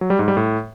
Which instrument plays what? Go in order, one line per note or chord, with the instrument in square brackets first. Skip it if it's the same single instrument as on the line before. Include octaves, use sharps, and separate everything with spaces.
[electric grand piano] F#3
G3
G#2
G3
A2